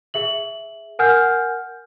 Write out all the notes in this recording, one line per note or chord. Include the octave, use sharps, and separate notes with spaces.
G#4 E5 F#7
A#4 F#5 G#5 F6 G6